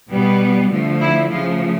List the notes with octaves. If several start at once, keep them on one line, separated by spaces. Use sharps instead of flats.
B2 G3 B3
D3 F3 A3
E4
C#3 F3 A3 F4